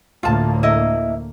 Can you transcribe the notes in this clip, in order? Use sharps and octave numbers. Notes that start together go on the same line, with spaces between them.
D2 A2 A#3 F4 A5
E4 D#5